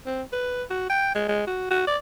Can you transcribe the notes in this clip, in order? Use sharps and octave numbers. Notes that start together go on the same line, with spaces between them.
C4
B4
F#4
G5
G#3
G#3
F#4
F#4
D5